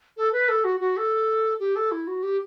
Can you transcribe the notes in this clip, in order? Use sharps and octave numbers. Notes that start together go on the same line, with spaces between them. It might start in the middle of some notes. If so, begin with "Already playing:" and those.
A4
B4
A4
F#4
F#4
A4
G4
A4
E4
F#4
G4